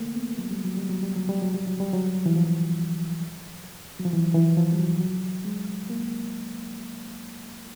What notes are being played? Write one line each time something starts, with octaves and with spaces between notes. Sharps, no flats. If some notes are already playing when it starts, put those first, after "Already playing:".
Already playing: A3 A#3
B3
F#3
G3
F#3
G3
F#3
G3
F#3
G3
F#3
G3
F#3
G3
F#3
E3
F3
F#3
F3
E3
E3
F3
G3
F#3
F#3
G#3
A#3